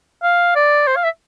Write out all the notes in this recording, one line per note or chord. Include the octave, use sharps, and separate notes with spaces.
F5
D5
C5
F5
E5